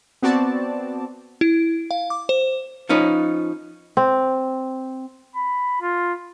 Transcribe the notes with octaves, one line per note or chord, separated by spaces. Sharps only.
B3 C4 F#4 D5 A5
E4
F5
D6
C5
F3 C#4 D#4 B4
C4
B5
F4